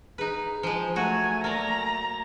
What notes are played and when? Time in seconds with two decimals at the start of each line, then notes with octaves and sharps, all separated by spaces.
0.18 D#4 G#4 B4
0.63 F3 G#3 C5
0.96 F#3 A3 F#4 G#5
1.44 A#3 D5 A#5